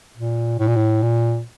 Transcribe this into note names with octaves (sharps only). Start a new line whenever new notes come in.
A#2
A2
A#2
A2
A#2